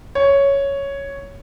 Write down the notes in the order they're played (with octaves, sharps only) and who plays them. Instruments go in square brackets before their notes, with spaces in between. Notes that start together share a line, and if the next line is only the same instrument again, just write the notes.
[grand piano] C#5